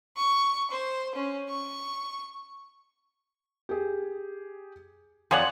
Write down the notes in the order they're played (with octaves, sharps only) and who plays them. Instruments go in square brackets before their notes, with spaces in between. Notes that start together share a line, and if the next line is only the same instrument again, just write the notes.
[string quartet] C#6
C5
C#4
C#6
[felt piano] G4 G#4
[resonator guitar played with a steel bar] F2 [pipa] G#4 C#5 D5 [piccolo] F#5 [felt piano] C6